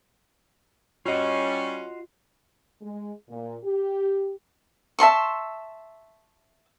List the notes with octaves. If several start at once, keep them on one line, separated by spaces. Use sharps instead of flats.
G3 C#4 F4 F#4 D#5
G#3
A#2
G4
E5 A5 C6 C#6